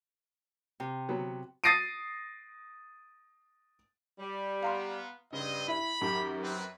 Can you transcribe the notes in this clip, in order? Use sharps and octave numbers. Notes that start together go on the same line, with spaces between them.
C3
F#3 B3
D#6 A6 A#6 C7 D7 D#7
G3
B3 F5 A#5 C6
G2 C#3 C4 C5 D#5
E4 B5
F#2 D#3 G4
C4 B4